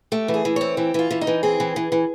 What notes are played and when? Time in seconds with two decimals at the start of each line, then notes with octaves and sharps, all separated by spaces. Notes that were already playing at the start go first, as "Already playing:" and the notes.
0.12 A3 G4
0.28 E3
0.34 G#4
0.45 E3
0.56 C4 C#5
0.77 E3 G4
0.94 E3 F4
1.11 E3
1.21 D#4
1.27 E3
1.43 C4 G#4
1.60 E3
1.76 E3
1.92 E3